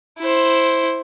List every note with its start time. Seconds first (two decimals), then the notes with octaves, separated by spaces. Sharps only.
0.19 E4 C5